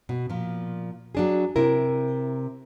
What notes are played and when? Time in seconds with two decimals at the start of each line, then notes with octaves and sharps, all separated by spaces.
0.09 B2
0.30 A#2 F3
1.15 F#3 D4 G#4
1.56 C3 E4 A#4